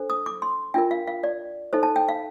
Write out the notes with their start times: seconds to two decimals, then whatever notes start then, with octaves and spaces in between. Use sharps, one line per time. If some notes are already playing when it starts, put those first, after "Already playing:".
Already playing: D4 A4 C5
0.10 D#6
0.26 D6
0.42 C6
0.74 D4 F4 A#4 G5
0.91 F5
1.07 F5
1.23 D5
1.73 D#4 A4 C5
1.83 A5
1.96 G5
2.08 F5